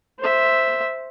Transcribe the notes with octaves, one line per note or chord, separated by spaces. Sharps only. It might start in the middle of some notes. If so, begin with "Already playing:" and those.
C5 E5